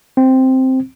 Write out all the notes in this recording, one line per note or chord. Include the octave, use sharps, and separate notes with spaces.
C4